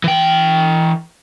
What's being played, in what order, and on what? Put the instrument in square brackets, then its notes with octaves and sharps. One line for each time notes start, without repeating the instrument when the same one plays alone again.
[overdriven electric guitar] E3 G5